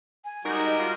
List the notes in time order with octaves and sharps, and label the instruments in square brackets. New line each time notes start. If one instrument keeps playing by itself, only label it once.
[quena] G#5
[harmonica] G3 G#3 F#4 [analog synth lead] D#4 [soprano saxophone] A#4
[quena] D#5
[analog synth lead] F4